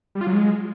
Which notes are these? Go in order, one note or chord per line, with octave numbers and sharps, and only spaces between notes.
G3
F4
F#3
G#3